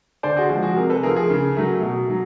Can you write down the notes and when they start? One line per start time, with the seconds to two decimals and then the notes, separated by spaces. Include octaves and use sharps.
0.23 D3 C5 D5
0.36 F#4 G#4
0.49 F3 G#3 F#4 G#4
0.63 F#4 G#4
0.76 C3 G#4 A#4
0.90 A4 B4
1.03 F3 A3 G#4 A#4
1.16 G#4 A#4
1.30 C#3
1.56 F#3 A3
1.83 B2
2.10 F#3